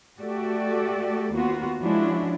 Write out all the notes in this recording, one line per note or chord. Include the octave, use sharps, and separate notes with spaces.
A3 F#4 G4 A4 D5
D#2 A#3 B3 F4 F#4
F3 G#3 C#4 D4 E4 F#4